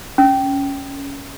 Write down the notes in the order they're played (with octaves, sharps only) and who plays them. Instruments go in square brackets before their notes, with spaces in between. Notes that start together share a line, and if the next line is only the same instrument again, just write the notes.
[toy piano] C#4